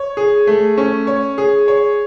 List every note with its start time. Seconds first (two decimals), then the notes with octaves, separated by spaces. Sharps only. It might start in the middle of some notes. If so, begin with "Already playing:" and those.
Already playing: C#5
0.17 G#4
0.47 A3
0.78 C#4
1.07 C#5
1.38 G#4
1.68 C#5